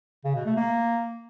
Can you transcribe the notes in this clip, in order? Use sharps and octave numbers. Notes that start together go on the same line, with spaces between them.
C#3
B2
A3
A#3